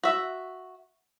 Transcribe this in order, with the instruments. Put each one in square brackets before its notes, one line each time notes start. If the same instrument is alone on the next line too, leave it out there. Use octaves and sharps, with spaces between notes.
[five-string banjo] F#4 E5